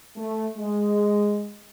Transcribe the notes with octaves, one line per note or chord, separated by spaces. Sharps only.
A3
G#3